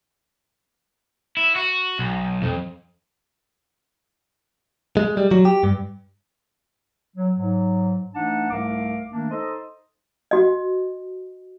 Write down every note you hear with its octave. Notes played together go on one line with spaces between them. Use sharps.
E4
F#4
B1
F2
G#3
G3
F#3
G4
G2
F#3
G#2 F#3
E3 A3 D4 D#4 F#5 A5
C2 G#2 A3 A#4 F5 D6
D#3 A3 A#3 D4
D#4 A4 C5 D#5
F#4 D#5